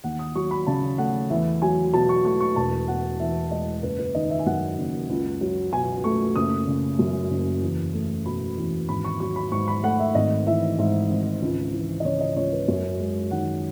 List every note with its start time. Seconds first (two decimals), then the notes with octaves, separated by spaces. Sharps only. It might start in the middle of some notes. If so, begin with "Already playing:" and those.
0.04 D#2 F#5
0.19 D#6
0.35 F#3 C#6
0.51 B5
0.67 C#3 A5
0.98 A3 F#5
1.30 E2 E5
1.62 F#3 G#5
1.93 B2 A5
2.09 C#6
2.25 A3 C#6
2.40 C#6
2.56 E1 A5
2.88 B2 F#5
3.20 E2 E5
3.51 G#3 D#5
3.83 F#1 B4
3.99 B4
4.14 D#3 D#5
4.30 E5
4.39 G#5
4.46 F#2 F#5
4.78 F#1
5.09 C#2
5.41 F#3
5.73 B2 G#5
6.04 A3 C#6
6.36 F#1 D#6
6.68 C#3
6.99 F#2
7.31 F#1
7.62 E2
7.94 A3
8.26 B2 B5
8.57 E2
8.89 G#1 B5
9.04 C#6
9.20 F#3 C#6
9.36 B5
9.52 G#2 C#6
9.68 B5
9.83 A3 F#5
10.00 E5
10.15 G#1 D#5
10.47 E3 E5
10.78 G#2 E5
11.10 G#1
11.42 C#2
11.73 E3
12.00 D#5
12.05 C#3 C#5
12.21 D#5
12.36 C#2 C#5
12.52 B4
12.68 F#2 C#5
13.00 G#3
13.31 D#3 F#5